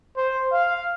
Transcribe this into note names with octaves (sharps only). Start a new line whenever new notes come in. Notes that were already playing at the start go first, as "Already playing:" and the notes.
C5
F5